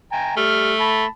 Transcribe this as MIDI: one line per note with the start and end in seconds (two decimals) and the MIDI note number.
0.12 0.35 79
0.12 0.35 80
0.12 0.35 82
0.37 0.73 55
0.37 1.05 57
0.37 0.73 89
0.80 1.07 81
0.80 1.07 83